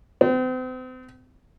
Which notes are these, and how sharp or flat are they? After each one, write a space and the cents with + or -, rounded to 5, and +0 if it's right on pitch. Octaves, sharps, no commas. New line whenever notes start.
C4 -40